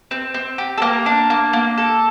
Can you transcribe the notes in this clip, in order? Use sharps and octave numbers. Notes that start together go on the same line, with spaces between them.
C4
C4
G4
A4
A#3 A#4
D4
A#3
A#3
A4